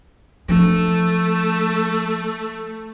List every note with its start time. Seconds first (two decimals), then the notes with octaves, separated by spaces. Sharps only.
0.49 F3 A3 D4